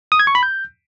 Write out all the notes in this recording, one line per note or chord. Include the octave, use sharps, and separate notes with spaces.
D#6
G#6
C#6
B5
G6